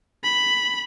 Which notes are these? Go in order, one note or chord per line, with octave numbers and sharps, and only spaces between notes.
B5